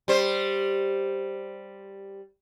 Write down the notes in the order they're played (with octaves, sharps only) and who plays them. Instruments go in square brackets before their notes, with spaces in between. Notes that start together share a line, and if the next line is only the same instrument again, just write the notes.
[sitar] G3 C5